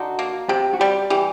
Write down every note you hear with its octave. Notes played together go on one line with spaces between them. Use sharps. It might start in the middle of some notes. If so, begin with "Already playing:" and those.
Already playing: D3 D#4 F#4
A#3
C3 G4
F#4
G3 G4
E3 G4